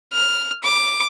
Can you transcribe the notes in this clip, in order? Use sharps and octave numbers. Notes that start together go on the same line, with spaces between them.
F6
D6